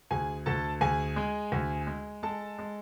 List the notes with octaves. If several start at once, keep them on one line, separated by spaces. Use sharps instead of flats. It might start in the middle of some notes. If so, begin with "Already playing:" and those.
D2 G#4 G#5
D2 A4 A5
D2 G#4 G#5
G#3
D2
G#3
G#3 A4 A5
G#3